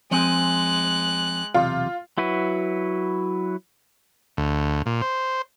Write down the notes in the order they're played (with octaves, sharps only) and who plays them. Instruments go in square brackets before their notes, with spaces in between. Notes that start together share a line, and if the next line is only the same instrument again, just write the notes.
[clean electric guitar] F3 C4 G#5 [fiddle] G#3 F#6
[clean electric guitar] B1 E2 C3 [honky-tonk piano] F4
[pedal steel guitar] F#3 E4 F#4 B4
[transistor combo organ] D2
A#2
C5